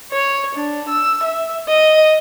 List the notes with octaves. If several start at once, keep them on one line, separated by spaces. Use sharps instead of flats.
C#5
D4
E6
E5
D#5